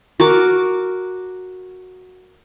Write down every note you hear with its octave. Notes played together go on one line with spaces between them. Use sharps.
F#4 A#4 D6